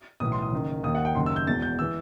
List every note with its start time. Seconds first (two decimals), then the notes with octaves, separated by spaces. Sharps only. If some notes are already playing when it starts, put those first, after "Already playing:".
0.20 B1 A2 E3 D#6
0.32 C6
0.42 D#6
0.52 F#1 F#2 D#3
0.83 D#2 D#3 D#6
0.95 F#5
1.05 G5
1.15 F#1 F#2 D#3 C6
1.26 E6
1.36 G6
1.47 E1 E2 B2 A6
1.62 G6
1.79 E3 E6